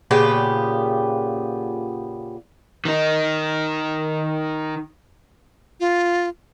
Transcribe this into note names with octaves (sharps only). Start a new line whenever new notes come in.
A#2 C#3 B3 G4
D#3 D#4
F4